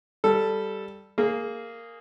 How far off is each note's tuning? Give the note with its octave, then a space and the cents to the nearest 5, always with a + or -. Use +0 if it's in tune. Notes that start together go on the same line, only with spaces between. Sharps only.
G3 +0 A4 +0
A#3 -10 G#4 +0